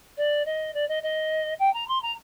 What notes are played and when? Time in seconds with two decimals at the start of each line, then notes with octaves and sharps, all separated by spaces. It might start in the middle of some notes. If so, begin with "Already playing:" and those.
0.17 D5
0.46 D#5
0.74 D5
0.88 D#5
1.03 D#5
1.59 G5
1.73 A#5
1.88 C6
2.02 A#5